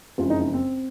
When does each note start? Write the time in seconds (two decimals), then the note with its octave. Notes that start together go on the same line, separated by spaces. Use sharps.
0.18 F#1 F2 C#3 F3 G#3 F4
0.30 D#4
0.41 D#4
0.53 C4